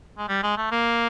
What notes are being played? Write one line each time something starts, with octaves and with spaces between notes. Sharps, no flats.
G#3
G3
G#3
A3
A#3